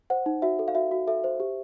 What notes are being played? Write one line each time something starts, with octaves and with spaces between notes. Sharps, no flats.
C5 F#5
D#4
F#4 E5
A4
F5
F#4 E5
F#4
A4 E5
C5
G4